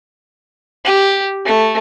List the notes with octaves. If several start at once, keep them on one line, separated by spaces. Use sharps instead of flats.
G4
A3